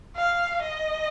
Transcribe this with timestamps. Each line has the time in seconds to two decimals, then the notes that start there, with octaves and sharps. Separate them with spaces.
0.16 F5
0.62 D#5